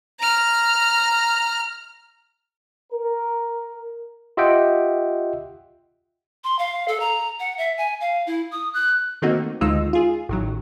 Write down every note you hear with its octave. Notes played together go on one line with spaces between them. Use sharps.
A#5 F6
A#4
F4 G4 D#5 E5 F#5 G5
C6
F5
A4
A#5
F#5
E5
G#5
F5
E4
D#6
F#6
D#3 A3 A#3 C4 D#4 F#4
D2 D#3 G#3 D#4 F4 E6
F4 G#4
A1 D#3 F#3